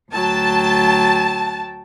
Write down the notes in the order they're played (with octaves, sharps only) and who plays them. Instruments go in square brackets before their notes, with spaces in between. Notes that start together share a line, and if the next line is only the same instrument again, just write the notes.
[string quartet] D2 F#3 G5 [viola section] A5